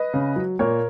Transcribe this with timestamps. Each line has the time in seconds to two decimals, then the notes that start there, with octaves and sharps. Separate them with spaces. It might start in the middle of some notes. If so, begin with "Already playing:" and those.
Already playing: B4 D#5
0.14 C#3
0.36 F#3
0.59 A#2 A#4 C#5